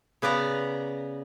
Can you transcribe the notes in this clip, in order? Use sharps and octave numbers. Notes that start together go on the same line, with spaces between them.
C#3 B3 B4 D5 A#5